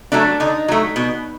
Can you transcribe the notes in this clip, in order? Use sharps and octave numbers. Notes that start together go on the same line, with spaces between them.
F#3 A3 D4
D3 D#4
F#3 A3
B2